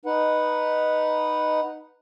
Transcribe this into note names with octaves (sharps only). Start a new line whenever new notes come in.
D#4 B4 F#5